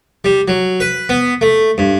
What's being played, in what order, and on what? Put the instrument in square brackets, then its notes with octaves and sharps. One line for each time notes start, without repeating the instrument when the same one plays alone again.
[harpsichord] G3
F#3
B4
B3
A3
G2